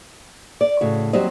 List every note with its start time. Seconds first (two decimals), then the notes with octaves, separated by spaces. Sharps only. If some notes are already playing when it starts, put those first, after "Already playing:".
0.61 D5
0.81 A2 C#3 F#4
1.13 D#2 F#3 G3 C4 D#5